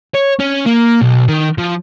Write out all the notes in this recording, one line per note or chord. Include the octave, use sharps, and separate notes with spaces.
C#5
C#4
A#3
B1
D#3
F3